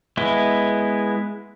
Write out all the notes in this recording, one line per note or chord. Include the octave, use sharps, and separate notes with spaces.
G#3 B3 E4